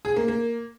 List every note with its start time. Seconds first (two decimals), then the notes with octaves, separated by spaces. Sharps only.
0.05 G#4
0.16 A#3
0.28 A#3